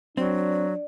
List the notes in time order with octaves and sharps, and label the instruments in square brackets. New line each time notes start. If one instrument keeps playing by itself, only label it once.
[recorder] F#3 [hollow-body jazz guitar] C4 [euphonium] D4 [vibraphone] D5